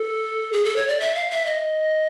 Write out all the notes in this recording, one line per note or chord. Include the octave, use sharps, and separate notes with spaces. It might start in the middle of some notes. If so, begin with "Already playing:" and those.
Already playing: A4
G#4
A4
C#5
D5
E5
F5
E5
D#5